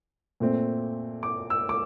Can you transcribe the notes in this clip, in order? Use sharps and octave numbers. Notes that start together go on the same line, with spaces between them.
A#2 A3 C4
D6
E6
D6